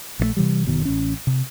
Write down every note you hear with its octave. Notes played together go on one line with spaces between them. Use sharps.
A#1 D3 A3
C3 E3 G3
F#1 B2 D#3
A1 C#4
C3